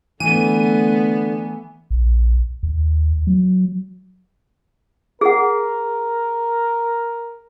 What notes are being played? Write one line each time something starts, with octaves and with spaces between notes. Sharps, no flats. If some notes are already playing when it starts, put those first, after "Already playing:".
D3 E3 A3 B3 D#7
A#1
D#2
F#3
G#4 A#4 F#5